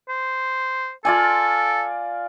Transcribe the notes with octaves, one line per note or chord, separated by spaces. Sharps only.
C5
F4 A4 D5 G#5